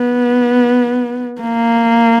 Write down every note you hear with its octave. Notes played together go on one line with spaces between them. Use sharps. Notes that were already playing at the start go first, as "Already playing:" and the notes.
Already playing: B3
A#3